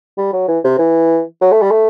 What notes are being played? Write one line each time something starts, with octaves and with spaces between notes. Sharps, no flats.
G3
F#3
E3
C3
E3
F#3
A3
G3
A3